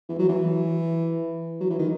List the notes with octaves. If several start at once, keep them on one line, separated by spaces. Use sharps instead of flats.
E3
F#3
E3
F#3
E3
D#3